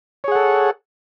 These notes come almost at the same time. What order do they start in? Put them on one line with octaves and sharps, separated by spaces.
C#5 G#4 F#5 A4